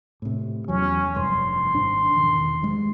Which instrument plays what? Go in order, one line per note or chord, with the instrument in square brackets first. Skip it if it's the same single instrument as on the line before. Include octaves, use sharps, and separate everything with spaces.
[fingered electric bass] A2 C3
[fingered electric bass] E2 F#3 [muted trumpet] C#4
[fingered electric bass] F1 G2 [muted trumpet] C6
[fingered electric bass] G#1 D4
E1 D#3
G2 G#3